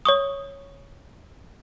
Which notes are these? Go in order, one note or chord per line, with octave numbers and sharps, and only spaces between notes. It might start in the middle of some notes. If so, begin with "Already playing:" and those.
C#5 C#6 D#6